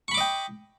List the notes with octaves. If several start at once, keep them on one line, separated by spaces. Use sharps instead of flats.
D#5 G5 B5 C#6 D6